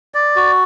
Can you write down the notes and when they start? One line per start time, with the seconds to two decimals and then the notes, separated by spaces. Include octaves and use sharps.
0.14 D5
0.36 F#4